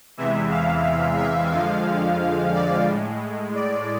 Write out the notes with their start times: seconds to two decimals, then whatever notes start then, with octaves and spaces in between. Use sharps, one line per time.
0.17 E2 C3 E3 G#3 E5
0.50 F5
1.18 E5
1.52 F2 D3 F3 G#3 F5
2.53 D5
2.87 A2 G#3
3.54 D5